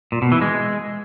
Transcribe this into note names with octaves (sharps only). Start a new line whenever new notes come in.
A#2
B2
E3
G#3